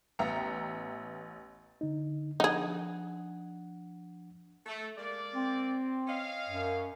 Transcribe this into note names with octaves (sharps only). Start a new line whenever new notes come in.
A1 B3 E5 G5 A#5 C#7
D3 D#4
F3 D4 D#4 G#4 F#5
A3
G#3 A#3 D5
C4
C#4 D#5 F5
F#2